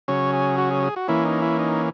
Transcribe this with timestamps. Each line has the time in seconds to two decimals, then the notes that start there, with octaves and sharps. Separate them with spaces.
0.08 C#3 F#3 C#4 C#5
0.33 G#4
0.58 F#4
0.71 G#4
0.83 G#4
0.96 F#4
1.08 E3 A#3 C#4 E4
1.25 D#4
1.42 E4
1.59 D#4